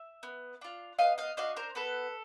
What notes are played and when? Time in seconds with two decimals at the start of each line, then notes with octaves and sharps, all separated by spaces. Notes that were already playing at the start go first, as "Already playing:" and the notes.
Already playing: E5
0.23 B3
0.61 D4 F4
0.99 B3 D#5 F5
1.18 D#5 F5
1.37 D4 F#4 D#5 F5
1.56 A#4 C5
1.75 B3 A4 B4